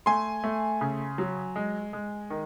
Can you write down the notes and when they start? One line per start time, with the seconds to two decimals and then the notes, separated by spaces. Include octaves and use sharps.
0.06 A3 G#5 C6
0.44 A3
0.81 C#3
1.18 F#3
1.56 G#3
1.93 G#3
2.30 D#3